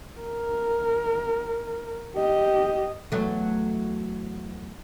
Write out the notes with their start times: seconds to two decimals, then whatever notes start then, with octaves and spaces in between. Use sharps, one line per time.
0.21 A#4
2.17 G4 D#5
3.12 E2 F#3 A3